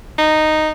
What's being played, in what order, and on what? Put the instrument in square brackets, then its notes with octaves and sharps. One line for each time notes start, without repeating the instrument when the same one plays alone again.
[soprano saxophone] D#4